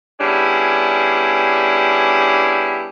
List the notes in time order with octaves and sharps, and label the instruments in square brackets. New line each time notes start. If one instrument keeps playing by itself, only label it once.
[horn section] G3 B3 C#4 D4 E4 G#4